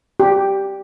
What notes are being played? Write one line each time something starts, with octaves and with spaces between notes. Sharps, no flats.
G4